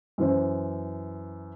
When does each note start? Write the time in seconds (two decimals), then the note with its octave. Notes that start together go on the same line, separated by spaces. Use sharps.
0.18 F#2 E3 C5